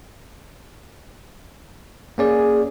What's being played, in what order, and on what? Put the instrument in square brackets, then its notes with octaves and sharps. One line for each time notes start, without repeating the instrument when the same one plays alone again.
[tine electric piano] A#3 C#4 D5 [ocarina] G#4